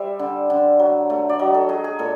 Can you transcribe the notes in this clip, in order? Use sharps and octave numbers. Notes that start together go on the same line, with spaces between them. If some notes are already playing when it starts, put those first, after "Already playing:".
Already playing: G3 C5 E5
D3
D3
F#3
A3
D5
F#3 D#5
A4
F#3 G#4
G#4
A#2 A4